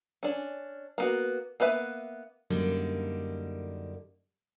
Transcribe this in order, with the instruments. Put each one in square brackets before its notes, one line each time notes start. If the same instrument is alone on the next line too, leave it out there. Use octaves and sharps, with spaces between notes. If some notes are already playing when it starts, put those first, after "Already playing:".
[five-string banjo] C#4 D4
A#3 B3 F#4
A#3 B3 B4 E5
[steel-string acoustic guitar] F#2 D3 G3 A#3 D4 D#4